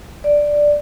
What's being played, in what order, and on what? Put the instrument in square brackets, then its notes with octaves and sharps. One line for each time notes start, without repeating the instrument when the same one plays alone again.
[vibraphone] D5